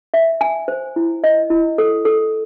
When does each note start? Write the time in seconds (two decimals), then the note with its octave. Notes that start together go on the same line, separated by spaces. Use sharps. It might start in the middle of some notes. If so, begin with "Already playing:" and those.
0.14 E5
0.41 G#5
0.68 C5
0.96 E4
1.24 D#5
1.50 E4
1.78 A4
2.05 A4